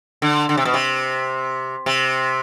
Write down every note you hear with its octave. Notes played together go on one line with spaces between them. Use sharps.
D3
D3
C3
B2
C3
C3